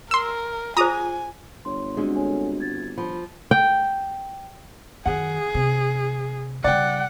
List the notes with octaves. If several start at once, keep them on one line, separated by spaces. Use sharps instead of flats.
A#4 C6 E6
F4 G#4 C5 G#5 A#5 D#6
G1 C#5 C6
G#3 C4 D4 F#4
A4 C#5 G#5
G#6 A6
F3 B5
G5
F#2 D#3 G#4 F#5
C3
C#3 G3 D5 F#5 G5